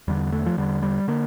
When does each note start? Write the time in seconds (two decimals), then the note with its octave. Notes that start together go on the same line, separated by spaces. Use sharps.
0.08 E2 D3 G3
0.32 A3
0.46 F3
0.57 E2 D3 G3
0.82 G3
1.08 D3 A#3